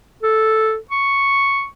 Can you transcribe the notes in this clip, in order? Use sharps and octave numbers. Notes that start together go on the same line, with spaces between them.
A4
C#6